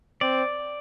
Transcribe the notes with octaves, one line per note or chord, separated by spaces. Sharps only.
C4 D5